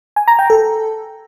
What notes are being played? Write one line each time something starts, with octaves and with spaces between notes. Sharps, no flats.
G#5
A#5
G5
A4